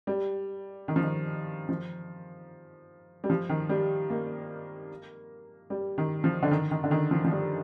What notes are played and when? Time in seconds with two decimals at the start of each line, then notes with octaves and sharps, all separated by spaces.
0.07 G3
0.88 D#3
0.96 F3
1.03 D#3
1.69 F3
3.24 G3
3.30 F3
3.49 D#3
3.69 G3
4.10 A#3
5.70 G3
5.98 D#3
6.24 F3
6.42 D3
6.51 D#3
6.71 D#3
6.84 D3
6.91 D#3
7.11 F3
7.24 F3
7.32 G3